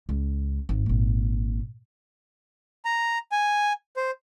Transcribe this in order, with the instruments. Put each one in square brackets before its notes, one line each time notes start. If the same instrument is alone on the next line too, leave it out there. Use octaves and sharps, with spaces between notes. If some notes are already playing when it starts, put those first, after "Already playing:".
[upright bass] C#2
G#1
G#1 A#2
[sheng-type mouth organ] A#5
G#5
C5